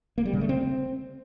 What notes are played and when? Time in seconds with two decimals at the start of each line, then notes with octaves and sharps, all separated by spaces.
0.18 A#3
0.25 G3
0.33 C#3
0.41 A3
0.49 C4